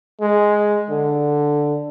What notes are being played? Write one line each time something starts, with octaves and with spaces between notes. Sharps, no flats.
G#3
D3